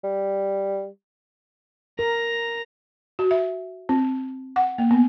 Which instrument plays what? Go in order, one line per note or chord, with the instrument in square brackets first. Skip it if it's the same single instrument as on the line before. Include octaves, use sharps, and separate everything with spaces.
[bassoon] G3
[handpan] A#4 [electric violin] A#5
[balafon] F#4
E5
C4
F#5
A#3
B3